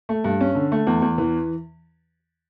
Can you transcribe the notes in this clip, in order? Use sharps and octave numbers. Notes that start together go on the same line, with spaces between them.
A3
G2
C#4
D3
A3
E2
E2
E3